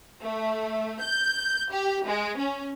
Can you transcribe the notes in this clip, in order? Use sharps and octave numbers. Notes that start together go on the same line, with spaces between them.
A3
G6
G4
G#3
C#4